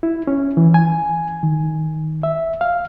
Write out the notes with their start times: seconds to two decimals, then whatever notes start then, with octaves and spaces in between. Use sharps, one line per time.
0.03 E4
0.27 C#4
0.57 E3
0.74 G#5
1.43 D#3
2.23 E5
2.61 F5